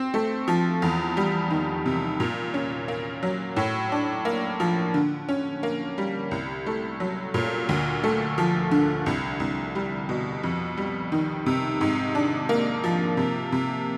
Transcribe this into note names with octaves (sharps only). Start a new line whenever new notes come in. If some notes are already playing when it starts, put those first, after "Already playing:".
Already playing: C4
A3
F3
E2
G3
D#3
C3
A#2
C#4
A#3
F#3
A2
D4
A#3
F3
D3
C#4
A#3
G3
C2
A3
F#3
A#2
D2
A3
F3
D3
C2
C2
G3
B2
F2
G3
D#3
C3
G#2
D4
A#3
F3
C3
C3